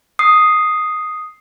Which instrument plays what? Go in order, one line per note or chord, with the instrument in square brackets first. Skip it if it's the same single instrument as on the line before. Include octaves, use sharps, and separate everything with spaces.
[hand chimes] D#6 C7